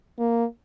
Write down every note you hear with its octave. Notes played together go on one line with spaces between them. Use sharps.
A#3